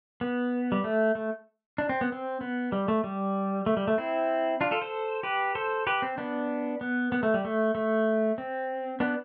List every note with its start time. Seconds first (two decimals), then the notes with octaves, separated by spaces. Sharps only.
0.21 B3
0.72 G3
0.84 A3
1.15 A3
1.78 D4
1.89 C4
2.01 B3
2.12 C4
2.41 B3
2.72 G3
2.88 A3
3.04 G3
3.66 A3
3.77 G3
3.88 A3
3.98 C4 E4
4.61 D4 F4
4.71 F4 A4
4.81 A4 C5
5.23 G4 B4
5.55 A4 C5
5.87 G4 B4
6.02 C4
6.18 B3 D4
6.81 B3
7.12 B3
7.23 A3
7.34 G3
7.45 A3
7.75 A3
8.38 C4
9.00 B3 D4